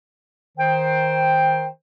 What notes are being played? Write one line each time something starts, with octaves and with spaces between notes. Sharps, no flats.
D#3 C5 G5